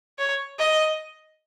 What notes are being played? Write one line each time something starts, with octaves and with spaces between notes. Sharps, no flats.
C#5
D#5